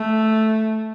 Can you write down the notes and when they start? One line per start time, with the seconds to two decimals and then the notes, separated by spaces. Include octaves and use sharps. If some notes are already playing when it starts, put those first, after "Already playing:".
Already playing: A3